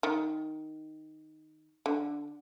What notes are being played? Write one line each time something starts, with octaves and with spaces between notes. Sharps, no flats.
D#3
D3